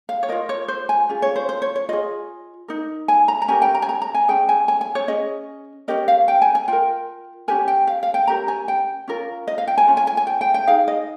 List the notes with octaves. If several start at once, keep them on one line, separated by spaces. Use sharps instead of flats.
F5
C#5
F4 A#4 D#5
C#5
C5
G#5
C#4 F4 G#4
C#5
C5
C5
C#5
C#5
F4 G#4 D#5
D#4 A#4
G#5
A#5
A#5
C#4 G4 A#4 G#5
G5
A#5
G#5
A#5
A#5
G#5
C#4 G#4 G5
G#5
G#5
G#5
C#5
C#4 G#4 D#5
C#4 G4 A#4 D#5
F5
G5
G#5
G#5
F4 A#4 G5
C#4 G4 A#4 G#5
G5
F5
F5
G5
C#4 G4 A#4 A#5
G#5
G5
C#4 F4 A#4
D#5
F5
G5
G#5
C#4 F4
G#5
G#5
G#5
G5
G5
G5
D#4 G#4 F5
D#5